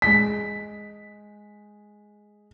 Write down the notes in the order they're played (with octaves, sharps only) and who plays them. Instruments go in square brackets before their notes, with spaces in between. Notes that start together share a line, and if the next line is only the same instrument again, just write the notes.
[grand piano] G#3 B6